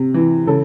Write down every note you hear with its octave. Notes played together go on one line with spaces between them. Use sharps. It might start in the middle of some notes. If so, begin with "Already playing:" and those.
Already playing: C3
E3
C#3 A4